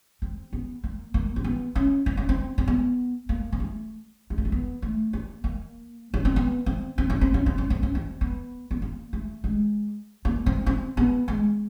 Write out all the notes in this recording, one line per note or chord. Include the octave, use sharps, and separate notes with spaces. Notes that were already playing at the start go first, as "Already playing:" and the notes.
C4
B3
A#3
A#3
C4
B3
C#4
C4
C#4
C4
C4
B3
A#3
A#3
A3
G#3
A3
A#3
B3
A3
A#3
A#3
C#4
C4
B3
C4
C4
C#4
C4
C#4
C4
C#4
C4
C#4
C4
B3
B3
A#3
A3
G#3
A#3
C4
C4
B3
G#3